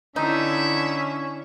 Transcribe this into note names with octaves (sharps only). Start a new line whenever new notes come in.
D3 C#4 D#4 E4 E5